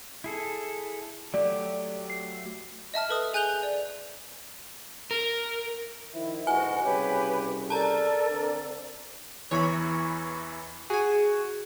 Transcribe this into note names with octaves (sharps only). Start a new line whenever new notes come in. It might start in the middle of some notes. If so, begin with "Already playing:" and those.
E4 G#4 A4
F#3 A3 G4 D5
C7
D#5 E5 A5 F6
A4 B4 D#6
G#4 G#5 F#6 G6 F7 G7
D5
A#4
D#3 F3 E4
D2 G#2 F#4 B4 D#5 F#5 G#5
C2 C#3 G4 B4 C#5
A4 A#4 D5 A5 A#5
D3 C4 D4
E2 E3 C#5 B5 C#6
F#4 G#4 G#5